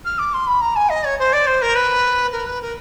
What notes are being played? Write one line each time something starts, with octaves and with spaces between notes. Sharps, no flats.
F6
D6
C6
B5
A#5
G#5
D#5
C#5
C5
D5
C5
A#4
B4
A#4
B4
A#4